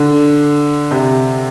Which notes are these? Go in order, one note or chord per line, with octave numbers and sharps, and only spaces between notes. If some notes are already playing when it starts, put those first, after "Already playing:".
Already playing: D3
C3